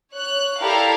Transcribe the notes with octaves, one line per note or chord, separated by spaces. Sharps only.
C#5 F#6
E4 G4 A4 A#4 D5 F5